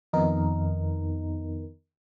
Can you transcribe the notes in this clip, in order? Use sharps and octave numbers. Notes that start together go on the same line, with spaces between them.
F2 D#3 B3 D#4 A#4